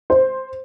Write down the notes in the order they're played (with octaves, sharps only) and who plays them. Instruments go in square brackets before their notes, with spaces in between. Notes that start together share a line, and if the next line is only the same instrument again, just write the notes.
[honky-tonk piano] C5